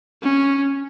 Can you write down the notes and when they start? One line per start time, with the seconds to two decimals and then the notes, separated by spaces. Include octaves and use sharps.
0.22 C#4